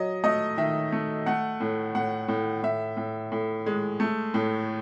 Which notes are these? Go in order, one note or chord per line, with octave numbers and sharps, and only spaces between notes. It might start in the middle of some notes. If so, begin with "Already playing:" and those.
Already playing: F#3 D#5
A3 D#5
D#3 E5
A3
A3 F#5
A2
A2 F#5
A2
A2 E5
A2
A2
G#3
A3
A2